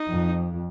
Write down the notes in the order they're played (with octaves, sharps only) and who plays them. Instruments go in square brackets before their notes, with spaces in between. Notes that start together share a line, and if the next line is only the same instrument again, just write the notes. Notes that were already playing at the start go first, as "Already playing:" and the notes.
Already playing: [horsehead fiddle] D#4
[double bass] F2